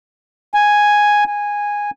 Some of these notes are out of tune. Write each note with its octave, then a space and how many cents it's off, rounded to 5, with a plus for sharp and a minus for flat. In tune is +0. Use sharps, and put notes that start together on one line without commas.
G#5 +0
G#5 -10